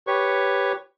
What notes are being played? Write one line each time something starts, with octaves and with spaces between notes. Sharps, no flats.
G4 B4 C#5 C#6